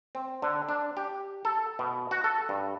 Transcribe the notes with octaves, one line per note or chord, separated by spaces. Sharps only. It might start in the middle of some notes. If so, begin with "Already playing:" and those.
C4
D3
D4
G4
A4
B2
F#4
A4
G2